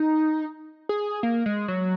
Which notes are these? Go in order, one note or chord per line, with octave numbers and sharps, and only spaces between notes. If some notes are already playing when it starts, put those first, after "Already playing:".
Already playing: D#4
G#4
A#3
G#3
F#3